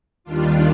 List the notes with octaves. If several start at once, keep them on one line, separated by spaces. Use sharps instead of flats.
D#2 D#3 G3 D4 F4